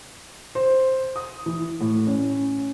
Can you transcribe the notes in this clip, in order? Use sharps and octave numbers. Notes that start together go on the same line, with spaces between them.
C5
D#6
E3
A2
C#4